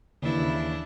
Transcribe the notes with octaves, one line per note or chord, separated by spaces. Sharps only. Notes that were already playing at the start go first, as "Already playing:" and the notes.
D#2 C#3 E3 D4 E4